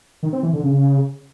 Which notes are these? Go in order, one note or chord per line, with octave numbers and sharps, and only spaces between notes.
D#3
C4
E3
D3
C#3